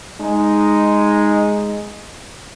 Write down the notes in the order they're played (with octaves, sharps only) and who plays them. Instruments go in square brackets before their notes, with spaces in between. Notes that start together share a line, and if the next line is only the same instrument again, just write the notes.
[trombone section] G#3 D#4